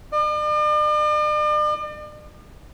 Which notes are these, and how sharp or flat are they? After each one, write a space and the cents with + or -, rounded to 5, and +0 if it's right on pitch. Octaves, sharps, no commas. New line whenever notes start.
D5 +45